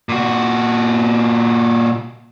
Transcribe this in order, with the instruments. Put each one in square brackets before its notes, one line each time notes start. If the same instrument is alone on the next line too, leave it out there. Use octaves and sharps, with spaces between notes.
[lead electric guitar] A#2 F#4